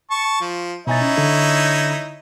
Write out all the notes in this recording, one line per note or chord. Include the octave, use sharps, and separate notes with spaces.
A5 C#6
F3
B2 D#4 E4 C#5 G#5 A6
C#4
D3 D4 A4